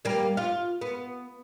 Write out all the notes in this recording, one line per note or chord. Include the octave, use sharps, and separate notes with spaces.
G3 A#3
F4
B3